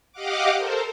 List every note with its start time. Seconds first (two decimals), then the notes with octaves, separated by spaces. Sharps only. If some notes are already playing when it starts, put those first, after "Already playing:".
0.12 G4 D#5 F5 F#5 D6
0.55 A4 A#4 C5